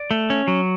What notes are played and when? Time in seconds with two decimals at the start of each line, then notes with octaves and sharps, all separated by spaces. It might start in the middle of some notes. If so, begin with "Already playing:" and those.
Already playing: D5
0.11 A3
0.30 C#4
0.48 F#3